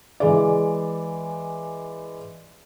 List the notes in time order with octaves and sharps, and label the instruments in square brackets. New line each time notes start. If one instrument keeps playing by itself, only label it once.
[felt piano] E3 G#3 D5